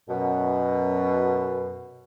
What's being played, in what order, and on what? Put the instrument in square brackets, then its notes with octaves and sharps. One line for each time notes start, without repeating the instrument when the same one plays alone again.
[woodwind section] F#2 B2